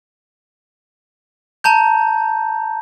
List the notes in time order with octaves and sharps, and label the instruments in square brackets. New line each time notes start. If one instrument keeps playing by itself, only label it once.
[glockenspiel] A5 A#5 G6